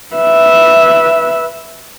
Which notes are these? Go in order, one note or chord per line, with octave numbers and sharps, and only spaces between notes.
B4 E5